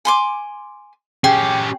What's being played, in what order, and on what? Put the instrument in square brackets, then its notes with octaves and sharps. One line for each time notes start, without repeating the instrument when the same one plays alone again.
[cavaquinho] G#5 C6 D6
[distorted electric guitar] C#4 G4 [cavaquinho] G#4 [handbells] G5